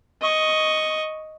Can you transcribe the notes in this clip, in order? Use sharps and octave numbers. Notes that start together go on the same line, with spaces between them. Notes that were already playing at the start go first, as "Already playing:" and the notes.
D#5 C#6